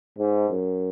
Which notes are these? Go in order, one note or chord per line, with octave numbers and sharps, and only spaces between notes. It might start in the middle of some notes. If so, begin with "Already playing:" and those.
G#2
F#2